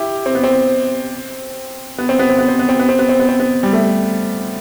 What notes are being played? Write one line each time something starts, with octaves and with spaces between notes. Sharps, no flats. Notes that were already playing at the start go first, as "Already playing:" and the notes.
Already playing: E4 G4
C4
B3
C4
B3
C4
B3
C4
B3
C4
B3
C4
B3
C4
B3
C4
B3
C4
B3
G3
A3